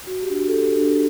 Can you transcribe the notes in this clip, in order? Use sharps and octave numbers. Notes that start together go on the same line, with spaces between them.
F#4
G4
D4
F#4
A4
F#4 G4
D4